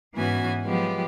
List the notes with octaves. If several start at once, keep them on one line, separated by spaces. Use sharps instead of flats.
G#2 E3 B3 C#4 F#4 G#5
F3 F#3 G#3 B3 G4